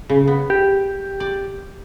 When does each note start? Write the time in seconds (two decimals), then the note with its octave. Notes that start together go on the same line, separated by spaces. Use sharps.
0.09 C#3
0.27 B3
0.50 G4
1.20 D5